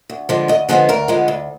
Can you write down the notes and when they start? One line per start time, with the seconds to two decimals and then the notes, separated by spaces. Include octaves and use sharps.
0.09 D2
0.29 D3 F3 G#3 B3
0.48 D2 D#5
0.69 D3 F3 G#3 B3 G#4
0.89 D2 A#4
1.08 D3 F3 G#3 B3
1.28 D2